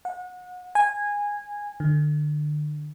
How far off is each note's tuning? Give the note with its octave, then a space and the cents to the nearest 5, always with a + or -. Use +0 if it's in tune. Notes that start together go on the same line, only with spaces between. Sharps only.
F#5 -30
G#5 -15
D3 +30